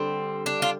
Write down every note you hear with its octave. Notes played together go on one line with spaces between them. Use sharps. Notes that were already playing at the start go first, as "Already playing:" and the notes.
Already playing: D3 G3 C4
D4
F4